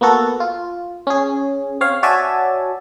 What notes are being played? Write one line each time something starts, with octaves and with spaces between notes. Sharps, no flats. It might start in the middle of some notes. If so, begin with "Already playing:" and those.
A#3 B3 F#4 A4
F4
C#4 G#4
C4 C#5 F5
F#4 C#5 D5 E5 G#5 A5